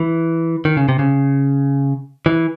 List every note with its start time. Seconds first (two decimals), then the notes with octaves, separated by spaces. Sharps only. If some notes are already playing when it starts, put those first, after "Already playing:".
Already playing: E3
0.65 D#3
0.77 C#3
0.89 C3
0.99 C#3
2.26 E3